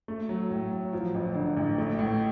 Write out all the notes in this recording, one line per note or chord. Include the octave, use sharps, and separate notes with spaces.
A3
F#3
A2
F#3
F3
A1
D3
A1
A3
A2